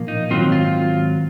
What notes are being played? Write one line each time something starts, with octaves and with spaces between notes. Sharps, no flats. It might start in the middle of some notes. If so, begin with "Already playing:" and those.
Already playing: A#2 F3 A#3
D#4
G#2 D#3 F#3 C4 F4
F4